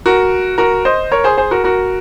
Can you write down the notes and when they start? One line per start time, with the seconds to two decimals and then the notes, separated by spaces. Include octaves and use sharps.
0.06 F#4 A#4
0.58 F#4 A#4
0.85 C5 D#5
1.12 A#4 C#5
1.24 G#4 C5
1.38 G#4 C5
1.51 F#4 A#4
1.64 F#4 A#4